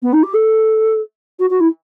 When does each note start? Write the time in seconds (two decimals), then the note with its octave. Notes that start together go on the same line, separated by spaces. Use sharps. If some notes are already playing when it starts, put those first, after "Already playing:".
0.02 B3
0.13 D#4
0.23 G4
0.34 A4
1.39 F#4
1.50 F#4
1.60 E4